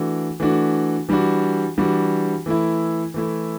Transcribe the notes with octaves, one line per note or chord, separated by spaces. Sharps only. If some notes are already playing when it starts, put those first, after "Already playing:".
Already playing: E3 A3 D4 F#4
E3 A3 D4 F#4
E3 G3 D4 F#4
E3 G3 D4 F#4
E3 A3 E4
E3 A3 E4